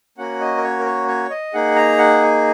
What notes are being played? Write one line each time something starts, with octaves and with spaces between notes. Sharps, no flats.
A#3 C#4 F#4 F#5
D#5
A#4
C#5
A#4
C#5
C#5
D#5
A#3 D#4 G#4 F#5
A#5
F#5